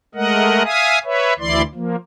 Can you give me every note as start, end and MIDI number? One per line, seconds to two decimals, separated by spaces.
0.15 0.63 56
0.15 0.63 57
0.15 0.63 70
0.15 0.63 75
0.15 0.63 78
0.64 0.99 76
0.64 0.99 77
0.64 0.99 80
0.64 0.99 87
1.05 1.33 71
1.05 1.33 73
1.05 1.33 76
1.39 1.62 38
1.39 1.62 52
1.39 1.62 64
1.39 1.62 74
1.39 1.62 84
1.75 1.96 53
1.75 1.96 58